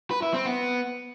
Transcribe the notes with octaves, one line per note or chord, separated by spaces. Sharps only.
B4
E4
C4
B3